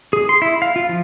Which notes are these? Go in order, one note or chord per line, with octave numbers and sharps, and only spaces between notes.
G#4
C6
E4
F5
F4
F3